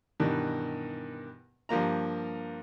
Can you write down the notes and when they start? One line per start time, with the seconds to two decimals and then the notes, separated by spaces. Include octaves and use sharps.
0.20 G2 B2 D#3 E3
1.69 G2 F3 A#3 A#5